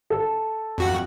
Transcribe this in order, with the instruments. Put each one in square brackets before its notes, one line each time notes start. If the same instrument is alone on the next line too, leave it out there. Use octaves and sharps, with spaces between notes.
[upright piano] A4
[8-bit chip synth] F2 F#4 F#5